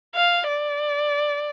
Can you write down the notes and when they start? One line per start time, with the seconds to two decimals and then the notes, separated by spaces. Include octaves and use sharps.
0.15 F5
0.48 D5